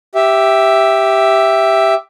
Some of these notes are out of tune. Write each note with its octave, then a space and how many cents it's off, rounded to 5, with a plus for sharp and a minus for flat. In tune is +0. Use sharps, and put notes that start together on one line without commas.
G4 +0 E5 +0